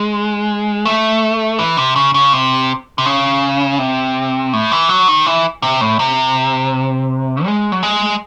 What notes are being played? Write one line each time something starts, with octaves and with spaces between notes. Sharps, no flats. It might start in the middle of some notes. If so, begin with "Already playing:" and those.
Already playing: G#3
A3
E3
C3
C#3
C#3
C3
C3
C#3
C3
A2
E3
F#3
D#3
E3
C3
A2
C3
G#3
F#3
G#3